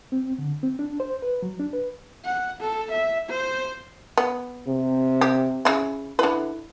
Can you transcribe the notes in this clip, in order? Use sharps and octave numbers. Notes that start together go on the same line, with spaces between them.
C4
D3
C4
D4
C5
B4
F#3
D4
B4
F#5
A4
E5
C5
B3
C3
G4
C#3 E4
D3 E4 B4